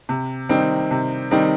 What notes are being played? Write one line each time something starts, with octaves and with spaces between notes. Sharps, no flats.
C3
D#3 G3 C4 D#4
C3
D#3 G3 C4 D#4